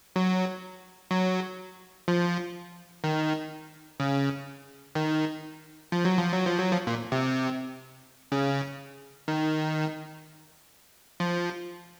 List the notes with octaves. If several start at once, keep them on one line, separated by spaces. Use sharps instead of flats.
F#3
F#3
F3
D#3
C#3
D#3
F3
F#3
F3
F#3
F3
F#3
F3
A#2
C3
C#3
D#3
F3